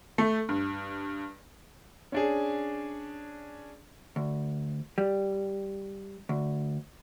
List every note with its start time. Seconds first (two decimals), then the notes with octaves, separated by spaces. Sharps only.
0.18 A3
0.49 G2
2.12 C#4 D4 G#4
4.16 D2
4.98 G3
6.29 D2